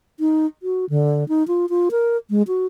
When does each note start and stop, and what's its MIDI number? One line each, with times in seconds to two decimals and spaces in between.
0.20 0.46 63
0.63 0.85 66
0.90 1.27 50
1.29 1.46 63
1.48 1.66 65
1.70 1.89 65
1.91 2.17 70
2.30 2.42 56
2.48 2.66 66